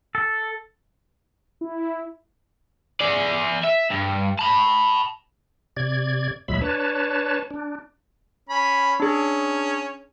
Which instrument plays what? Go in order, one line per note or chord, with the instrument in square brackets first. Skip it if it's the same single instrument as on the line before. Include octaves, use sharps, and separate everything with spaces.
[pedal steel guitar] A4
[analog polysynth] E4
[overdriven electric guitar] G#4 D5
E5
G2
A5 B5
[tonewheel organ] C3 D5 G#6
D#2 A#2 F#3 G#3 E5 B5
D4 B4 C#5 A5
D4
[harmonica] C#4 B5
[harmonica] C#4 [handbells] D4 G#4